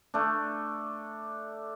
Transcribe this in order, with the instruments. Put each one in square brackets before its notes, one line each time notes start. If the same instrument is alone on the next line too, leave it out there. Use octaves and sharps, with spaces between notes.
[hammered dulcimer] A3 D4